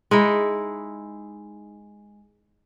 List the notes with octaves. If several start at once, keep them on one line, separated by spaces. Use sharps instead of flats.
G#3 D#4 E4